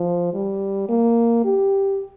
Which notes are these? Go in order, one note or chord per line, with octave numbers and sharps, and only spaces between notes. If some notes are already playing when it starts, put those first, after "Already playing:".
Already playing: F3
G3
A#3
G4